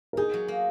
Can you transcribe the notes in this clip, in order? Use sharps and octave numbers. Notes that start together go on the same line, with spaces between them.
A#4
D#4 G#4
F#3
A#3